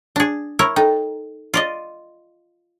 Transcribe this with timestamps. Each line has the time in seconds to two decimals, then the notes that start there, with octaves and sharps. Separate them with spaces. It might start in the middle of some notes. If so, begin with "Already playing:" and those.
0.16 D4 G#4
0.59 E4 A#4 C#5
0.76 D#4 A4 G5
1.54 F4 D5 D#5